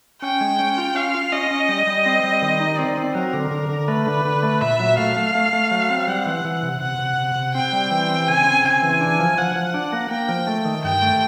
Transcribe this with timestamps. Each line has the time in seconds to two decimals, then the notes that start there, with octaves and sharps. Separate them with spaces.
0.22 C#4 G5
0.41 G#3
0.59 C#4
0.78 F4
0.95 C#4 F5
1.14 F4
1.32 C#4 D#5
1.51 C#4
1.69 G3
1.87 G3
2.06 C4
2.24 G3
2.42 D#3
2.60 D#4
2.78 C4 D5
2.97 C4
3.15 F#3 A#4
3.33 D3
3.51 D3
3.69 D3
3.88 A3 B4
4.07 D3
4.25 D3
4.43 A3
4.61 A#2 E5
4.80 F#3
4.98 A3 F5
5.17 A3
5.35 A3
5.53 A3
5.71 F#3
5.90 C4
6.07 G3 F#5
6.26 E3
6.45 E3
6.63 C3
6.81 C3 F#5
6.99 C3
7.18 C3
7.36 C3
7.55 C4 G5
7.73 G3
7.91 E3
8.09 C4
8.28 C#3 G#5
8.46 C4
8.64 C#3 G#5
8.82 E3
9.01 D4
9.19 F3
9.38 F3 F#5
9.56 F3
9.74 D4
9.93 A#3
10.11 A#3 G5
10.29 F3
10.47 A3
10.65 D#3
10.84 G2 G5
11.02 A3